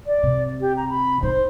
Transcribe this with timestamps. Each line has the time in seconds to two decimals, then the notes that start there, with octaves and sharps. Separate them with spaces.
0.06 D5
0.23 C3
0.61 G4
0.77 A#5
0.89 B5
1.23 D#4 C5